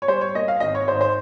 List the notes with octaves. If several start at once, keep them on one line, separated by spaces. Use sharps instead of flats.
C#5
G3 C5
C#5
A#3 D#5
F5
G#1 D#5
C#5
G#2 C5
C5